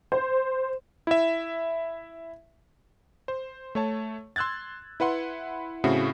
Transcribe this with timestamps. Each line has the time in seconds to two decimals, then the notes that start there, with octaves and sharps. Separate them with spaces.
0.12 C5
1.07 E4 E5
3.28 C5
3.75 A3 C#5 A5
4.36 C6 E6 F#6 G#6 A6
5.00 E4 B4 F#5 C6
5.84 A2 C#3 A3 C4 E4 F#4